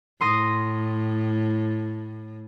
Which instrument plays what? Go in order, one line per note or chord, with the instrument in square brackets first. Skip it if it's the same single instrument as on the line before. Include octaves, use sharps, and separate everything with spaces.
[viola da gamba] A2 [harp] C6 D#6 A#6